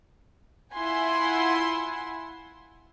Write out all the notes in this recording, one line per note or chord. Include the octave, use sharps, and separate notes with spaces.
E4 F4 F#5 G#5 C6